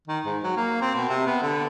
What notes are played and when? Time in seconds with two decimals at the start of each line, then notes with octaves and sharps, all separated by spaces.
0.08 D#3
0.25 G#2
0.43 F#3
0.57 A#3
0.81 C4
0.95 B2
1.09 C3
1.26 B3
1.42 D3